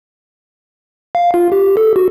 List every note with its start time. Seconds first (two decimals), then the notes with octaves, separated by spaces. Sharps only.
1.15 F5
1.34 F4
1.52 G4
1.77 A4
1.96 F#4